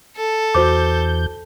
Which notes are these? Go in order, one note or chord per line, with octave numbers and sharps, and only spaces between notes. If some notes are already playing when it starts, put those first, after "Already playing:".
A4
E2 F#4 C5 D6 G6